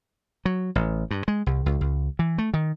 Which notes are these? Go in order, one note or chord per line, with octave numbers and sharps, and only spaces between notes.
F#3
A1
G2
G#3
C2
C#2
C#2
E3
A3
D#3